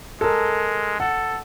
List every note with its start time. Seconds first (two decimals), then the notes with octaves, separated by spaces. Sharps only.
0.21 G#3 A4 A#4
1.00 A4 F#5